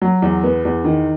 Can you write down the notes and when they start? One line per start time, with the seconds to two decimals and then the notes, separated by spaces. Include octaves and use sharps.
0.02 F#3
0.22 E2
0.44 B3
0.65 E2
0.84 D#3